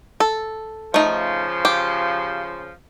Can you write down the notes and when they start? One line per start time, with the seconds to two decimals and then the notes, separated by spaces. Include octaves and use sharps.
0.20 A4
0.94 C#3 F3 A3 D#4
1.65 G4